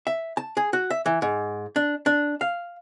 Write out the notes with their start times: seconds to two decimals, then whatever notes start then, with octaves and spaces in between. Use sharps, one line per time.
0.07 E5
0.37 A5
0.57 G#4
0.73 F#4
0.90 E5
1.06 E3
1.22 G#2
1.76 D4
2.06 D4
2.41 F5